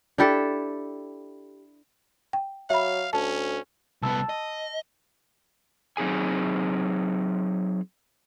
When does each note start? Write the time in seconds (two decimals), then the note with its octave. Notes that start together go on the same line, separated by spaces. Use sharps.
0.18 D4 E4 G4 A4
2.33 G5
2.70 F#3 E5 F5 B5
3.13 D2 C#4 A5
4.02 C2 B3 A5 E6
4.29 D#5
5.97 F#3 C4 D#4 G#4 G#5